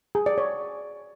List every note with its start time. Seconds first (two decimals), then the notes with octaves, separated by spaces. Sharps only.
0.15 G#4
0.26 D5
0.38 C#5